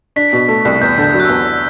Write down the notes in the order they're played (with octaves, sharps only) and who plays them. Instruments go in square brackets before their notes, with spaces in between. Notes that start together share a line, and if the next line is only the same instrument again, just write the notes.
[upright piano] D4 [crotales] B6
[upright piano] B2
A3
C2
[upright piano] E2 [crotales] G6
[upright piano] D3 [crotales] G6
[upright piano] F#3
[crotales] F#6
[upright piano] E2 [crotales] E6
[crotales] E6